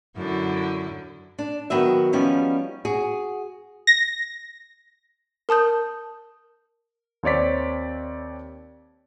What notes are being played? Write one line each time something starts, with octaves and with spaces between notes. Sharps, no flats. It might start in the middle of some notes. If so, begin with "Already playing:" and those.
F#2 D3 E4
D4
D#3 F#3 B3 E5
F3 G3 B3 C#4 D#4
F#4 G#4
A#6
A#4 A5 D#6 G6
D#2 C4 C#5 D5 B6